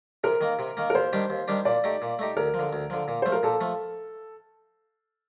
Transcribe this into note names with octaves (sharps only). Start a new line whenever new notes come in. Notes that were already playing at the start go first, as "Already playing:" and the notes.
C3 A#4
D#3 A#3
C3
D#3 A#3
A#4
D#2 C5
D#3 G3 D4 G4
D#2
D#3 G3 D4 G4
A#2 D5
A3 D#4 G4
A#2
A3 D#4 G4
D2 A#4
F3
D3
D2
D3 F3
A#2
F3 A3 C5
A#4
A#2 A4
F3 A3